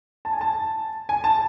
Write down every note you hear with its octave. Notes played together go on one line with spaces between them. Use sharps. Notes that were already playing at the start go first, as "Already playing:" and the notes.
A5
G#5
A5
G#5
A5